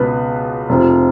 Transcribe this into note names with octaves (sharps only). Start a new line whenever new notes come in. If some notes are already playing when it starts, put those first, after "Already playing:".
Already playing: C#2 B2 B4
F1 F2 F3